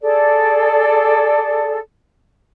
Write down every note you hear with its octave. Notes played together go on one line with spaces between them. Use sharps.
G#4 A4 D5